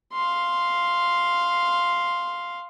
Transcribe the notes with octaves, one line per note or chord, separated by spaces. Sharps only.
F5 C6